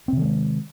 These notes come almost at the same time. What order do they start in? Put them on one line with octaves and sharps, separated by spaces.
C4 C3 D#3 G#3